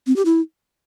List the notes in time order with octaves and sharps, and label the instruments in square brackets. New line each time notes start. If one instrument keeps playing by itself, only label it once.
[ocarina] C4
G4
E4